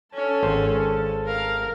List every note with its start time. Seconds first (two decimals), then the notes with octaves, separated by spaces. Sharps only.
0.14 C#4 A4 A5
0.43 G#1 C5
1.26 A#4 F5